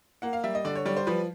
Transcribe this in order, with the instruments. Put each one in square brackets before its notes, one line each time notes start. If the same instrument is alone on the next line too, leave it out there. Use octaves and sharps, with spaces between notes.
[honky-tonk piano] A#3 F#5
F5
G3 E5
D#5
D3 D5
C#5
G3 C#5
C5
F3 B4